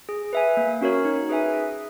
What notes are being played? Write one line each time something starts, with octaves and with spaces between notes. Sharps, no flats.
G#4
B4 E5 G#5
A#3
C#4 F#4 A#4 C#5
D#4
G#4 B4 E5 G#5
G#4